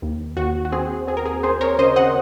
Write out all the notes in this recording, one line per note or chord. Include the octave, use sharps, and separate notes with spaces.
D#2
D#2 F#4
F#4
C4 G#4
C4 G#4
A#4
G#4
C4 G#4 C5
A#4 C#5
C#3 C5 D#5
D#5 F#5